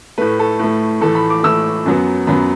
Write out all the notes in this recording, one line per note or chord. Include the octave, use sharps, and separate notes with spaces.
A2 A3 B4
A4
A2 A3
A2 E3 A3 A4
B5
D6
A2 E3 A3 E6
F#2 F#3 B3
F#2 F#3 B3 B5